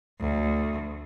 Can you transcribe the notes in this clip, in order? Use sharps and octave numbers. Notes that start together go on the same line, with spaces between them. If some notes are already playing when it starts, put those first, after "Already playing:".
D2